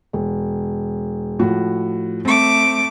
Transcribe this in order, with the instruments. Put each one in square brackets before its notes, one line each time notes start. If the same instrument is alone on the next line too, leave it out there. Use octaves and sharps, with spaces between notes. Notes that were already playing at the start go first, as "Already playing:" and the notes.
[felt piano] E1
A2 F3 F#4
[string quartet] A3 D6 [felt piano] C4